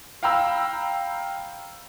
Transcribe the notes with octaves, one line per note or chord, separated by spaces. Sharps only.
F5 G5 A#5 B5 E6